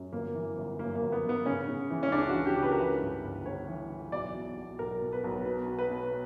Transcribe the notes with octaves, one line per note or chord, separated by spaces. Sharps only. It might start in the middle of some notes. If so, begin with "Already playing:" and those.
Already playing: F#2
G1 A#3
E3
G1
F#2 A#3
A#3
G1
B3
G1
B3
C#3 C#4
C#3
E3
C#4
C#2 D4
F#4
E3
G4
C#2
B4
A#4
E3 B4
G2
G1
G1 C#5
E3
E3
B1 D5
B2
B2
B1 A#4
B2
B4
B1
B2 B4
B2
B4
B2